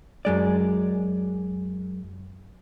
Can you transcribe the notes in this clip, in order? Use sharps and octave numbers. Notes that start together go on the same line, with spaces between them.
F#2 G#3 D5